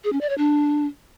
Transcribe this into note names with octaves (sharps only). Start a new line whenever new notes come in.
G#4
C#4
D5
C#5
D4